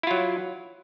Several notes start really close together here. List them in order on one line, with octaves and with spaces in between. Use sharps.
E4 F4 F#3